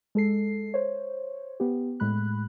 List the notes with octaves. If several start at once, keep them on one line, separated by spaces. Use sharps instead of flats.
G#3 A4 C7
C5 C#5
B3 G4
A2 G#3 B5 F#6